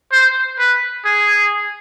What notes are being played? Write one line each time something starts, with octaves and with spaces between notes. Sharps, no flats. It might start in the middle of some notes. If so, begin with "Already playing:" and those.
C5
B4
G#4